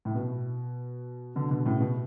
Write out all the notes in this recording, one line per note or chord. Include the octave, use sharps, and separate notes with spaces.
A2
B2
B2 D3
B2 D3
A2 C#3
B2